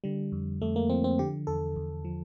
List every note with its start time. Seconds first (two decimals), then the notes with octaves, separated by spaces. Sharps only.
0.04 D3 G3
0.32 F2
0.62 F2 A3
0.76 A#3
0.90 F3 C4
1.04 C4
1.19 D3 G4
1.47 E2 A4
1.76 E2
2.05 F3